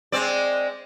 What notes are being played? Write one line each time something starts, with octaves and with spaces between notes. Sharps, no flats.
G#3 C4 D5